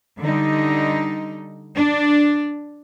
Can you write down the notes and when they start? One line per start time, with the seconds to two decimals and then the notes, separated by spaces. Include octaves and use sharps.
0.20 D3 G3 D#4
1.73 D4